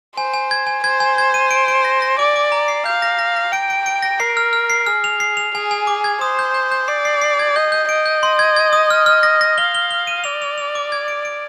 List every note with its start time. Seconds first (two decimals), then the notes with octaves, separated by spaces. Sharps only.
0.17 C5 G#5
0.34 G#5
0.51 G#6
0.67 G#5
0.84 C5 G#6
1.00 G#5
1.18 G#6
1.34 D#7
1.51 D7
1.68 D7
1.85 A#6
2.02 A#6
2.19 D5 D6
2.36 D6
2.52 A#5
2.68 C7
2.86 F5 G6
3.02 A#6
3.19 A#6
3.36 A#6
3.52 G5 D7
3.70 D7
3.86 D7
4.02 A#6
4.19 A#4 C7
4.37 F6
4.53 F6
4.70 C7
4.87 G#4 F6
5.04 F7
5.20 C7
5.37 F7
5.55 G#4 G#5
5.71 G#5
5.87 D6
6.04 G#6
6.21 C5 D#6
6.39 G6
6.54 G6
6.71 G6
6.88 D5 C7
7.05 C7
7.21 C7
7.39 G#6
7.56 D#5 G6
7.72 G6
7.89 D#5 D7
8.06 G6
8.23 C6
8.39 G#6
8.56 G#6
8.73 D#6
8.90 F6
9.06 F6
9.23 A#6
9.41 A#6
9.57 F5 G7
9.75 G7
9.91 G7
10.07 D#7
10.24 D5 F7
10.42 F7
10.58 F7
10.75 D6
10.92 G#6
11.08 D7
11.25 D7